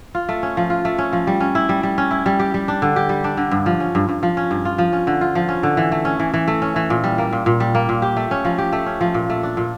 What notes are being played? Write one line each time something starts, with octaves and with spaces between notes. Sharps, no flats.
F4
A3
C#4
F3
F4
A3
C#4
F3
G3
C#4
E4
G3
G3
C#4
E4
G3
G4
G3
D4
D3
G4
G3
D4
D3
G2
F3
C#4
G2
G2
F3
C#4
G2
F4
F3
C#4
D3
F4
F3
C#4
D3
E3
A3
C#4
E3
E3
A3
C#4
E3
A#2
G3
A#3
A#2
A#2
G3
A#3
A#2
G4
A3
C#4
F3
G4
A3
C#4
F3
A#2
A3
D4
A#2